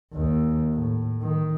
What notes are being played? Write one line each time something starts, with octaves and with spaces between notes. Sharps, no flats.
D#2
A2
D#3